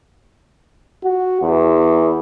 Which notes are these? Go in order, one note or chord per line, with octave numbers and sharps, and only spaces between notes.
F#4
E2